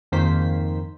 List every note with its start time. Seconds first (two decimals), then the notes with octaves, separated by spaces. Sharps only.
0.12 F2 G#2 D#3 A#3 C5 B6